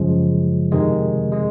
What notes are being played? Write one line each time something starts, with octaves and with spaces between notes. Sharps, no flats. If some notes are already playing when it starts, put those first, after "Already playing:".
Already playing: F#2 C#3 F3 G#3
F2 C3 D#3 G#3
G#3